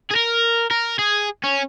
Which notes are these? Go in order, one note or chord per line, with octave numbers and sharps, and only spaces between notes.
G#4
A#4
A#4
G#4
C#4